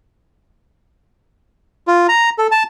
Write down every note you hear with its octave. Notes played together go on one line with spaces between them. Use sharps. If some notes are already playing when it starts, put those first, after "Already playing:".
F4
A#5
A4
A5